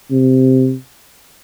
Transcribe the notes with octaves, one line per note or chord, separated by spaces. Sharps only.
C3